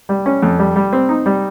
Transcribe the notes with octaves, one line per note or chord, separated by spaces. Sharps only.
G3
C#4
F2
G3
G3
C4
D#4
G3